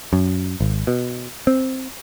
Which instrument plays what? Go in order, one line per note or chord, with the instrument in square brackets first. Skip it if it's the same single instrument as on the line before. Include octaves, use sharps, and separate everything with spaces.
[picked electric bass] F#2
G#1
B2
C4